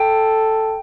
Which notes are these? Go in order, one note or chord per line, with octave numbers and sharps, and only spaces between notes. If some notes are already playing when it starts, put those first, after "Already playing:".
Already playing: A4 G5